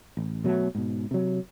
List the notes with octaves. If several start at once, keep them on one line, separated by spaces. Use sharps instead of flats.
A1
B2 F#3 G#3 A3
G#2 B2
C3 F#3